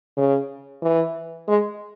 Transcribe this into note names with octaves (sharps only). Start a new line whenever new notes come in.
C#3
E3
G#3